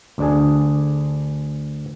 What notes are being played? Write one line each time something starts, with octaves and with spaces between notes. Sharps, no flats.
D2 D4 G#4